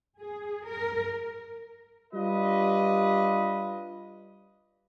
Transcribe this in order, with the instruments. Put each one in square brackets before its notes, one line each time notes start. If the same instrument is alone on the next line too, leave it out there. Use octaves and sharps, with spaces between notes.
[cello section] G#4
A#4
[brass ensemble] G3 D4 F4 B4 D#5